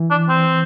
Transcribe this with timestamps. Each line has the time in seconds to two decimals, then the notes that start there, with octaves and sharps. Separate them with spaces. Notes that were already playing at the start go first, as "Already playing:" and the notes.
Already playing: E3
0.11 D4
0.29 C4